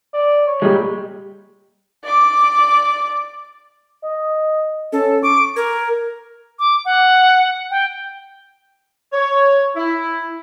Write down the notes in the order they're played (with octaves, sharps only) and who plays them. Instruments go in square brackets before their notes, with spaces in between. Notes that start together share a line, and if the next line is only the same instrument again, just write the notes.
[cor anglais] D5
C#5
[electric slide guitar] A#2 G3 G#3
[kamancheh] D5 D6
[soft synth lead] D#5
[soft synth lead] C#4 [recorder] A4
[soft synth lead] C#6 [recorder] D6
[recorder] A#4 [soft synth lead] G#6
[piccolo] D6
F#5
G5
[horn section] C#5
E4